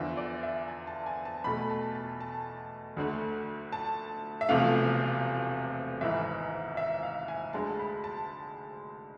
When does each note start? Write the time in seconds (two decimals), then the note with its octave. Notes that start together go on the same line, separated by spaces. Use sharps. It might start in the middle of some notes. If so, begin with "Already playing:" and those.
Already playing: E2 D3 F3 E5
0.17 D5
0.43 E5
0.68 G#5
0.87 A5
1.06 G#5
1.25 A5
1.44 E2 B2 A3 B5
1.70 A5
1.95 A5
2.21 A5
2.97 D2 D3 A3
3.73 A5
4.41 E5
4.49 E1 E2 C3 F3 A3 F5
6.01 G#1 G#2 E3 E5
6.77 E5
7.03 F5
7.28 G#5
7.53 D2 D3 G#3 A5
7.79 B5
8.04 A5